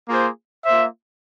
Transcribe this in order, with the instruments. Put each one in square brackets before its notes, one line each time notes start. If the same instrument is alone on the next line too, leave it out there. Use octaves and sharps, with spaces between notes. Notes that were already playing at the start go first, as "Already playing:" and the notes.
[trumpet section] A#3 F4 G#4 C5
A#3 F4 C5 E5